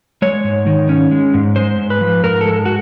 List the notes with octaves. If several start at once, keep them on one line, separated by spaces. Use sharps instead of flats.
G#3 C#5
G#2
D#3
C#4
G#3
G#2
G#3 C5
G#2
B4
F3
G#2 A#4
G#3 A4
F#4